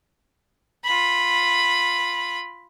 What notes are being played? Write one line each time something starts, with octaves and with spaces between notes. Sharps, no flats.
F4 B5